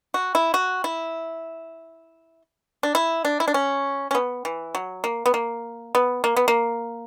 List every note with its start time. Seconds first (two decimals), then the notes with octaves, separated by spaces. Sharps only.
0.14 F#4
0.35 E4
0.54 F#4
0.84 E4
2.83 D4
2.95 E4
3.25 D4
3.40 E4
3.48 D4
3.54 C#4
4.11 C#4
4.15 B3
4.45 E3
4.75 F#3
5.04 A#3
5.26 B3
5.34 A#3
5.95 B3
6.24 A#3
6.36 B3
6.48 A#3